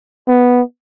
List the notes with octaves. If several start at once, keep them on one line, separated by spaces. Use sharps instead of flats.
B3